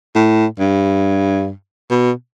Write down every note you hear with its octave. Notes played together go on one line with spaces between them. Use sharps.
A2
G2
B2